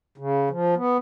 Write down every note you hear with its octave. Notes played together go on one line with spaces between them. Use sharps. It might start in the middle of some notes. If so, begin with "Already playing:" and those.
C#3
F3
B3